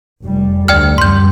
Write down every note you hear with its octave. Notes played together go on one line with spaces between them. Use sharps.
F1 G3
D2 D5 G5 F6
F#2 G3 C6 G6